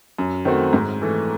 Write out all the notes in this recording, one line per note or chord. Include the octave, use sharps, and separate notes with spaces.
F#2
D#3 A3 C4 F#4
G#2
E3 A3